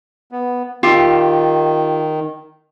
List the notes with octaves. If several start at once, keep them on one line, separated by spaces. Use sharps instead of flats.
B3
D#3 F4 G4 E5